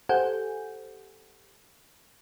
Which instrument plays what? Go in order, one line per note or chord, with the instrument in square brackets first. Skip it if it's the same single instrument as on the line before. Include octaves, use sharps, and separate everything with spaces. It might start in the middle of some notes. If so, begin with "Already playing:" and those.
[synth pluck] G4 A4 C5 F#5 G#5 G6